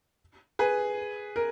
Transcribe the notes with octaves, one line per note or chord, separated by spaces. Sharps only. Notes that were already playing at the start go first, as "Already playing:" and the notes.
G#4 B4
A#4